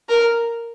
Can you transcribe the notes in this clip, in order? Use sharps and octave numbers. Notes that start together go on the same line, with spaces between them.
A#4